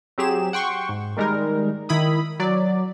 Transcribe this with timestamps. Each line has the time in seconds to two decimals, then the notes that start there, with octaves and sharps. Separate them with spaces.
0.18 F#3 C4 G4 G#4 E7
0.53 F#5 G5 C6 C#6
0.89 G#2
1.17 D#3 G3 G#3 D#4 A#4
1.89 D#3 E4 B5 D#6
2.40 F#3 D5